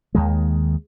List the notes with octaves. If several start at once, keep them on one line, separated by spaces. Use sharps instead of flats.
D#2 D#3 G#3